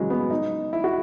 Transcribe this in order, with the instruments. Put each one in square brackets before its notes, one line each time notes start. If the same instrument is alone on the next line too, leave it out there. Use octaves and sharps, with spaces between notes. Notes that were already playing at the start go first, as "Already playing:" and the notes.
Already playing: [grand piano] C#3 E3 F#3 G#3
B3
D#4
E4
F#4